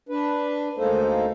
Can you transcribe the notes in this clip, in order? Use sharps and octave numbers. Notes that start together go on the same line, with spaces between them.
D4 B4
D2 G#3 A#3 D#4 A4 C5